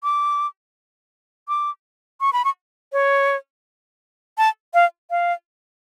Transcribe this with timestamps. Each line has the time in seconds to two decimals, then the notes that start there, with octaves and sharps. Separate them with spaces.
0.04 D6
1.48 D6
2.21 C#6
2.33 B5
2.45 C#6
2.93 C#5
4.38 A5
4.74 F5
5.11 F5